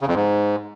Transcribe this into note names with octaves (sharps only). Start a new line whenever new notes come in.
C#3
F2
G#2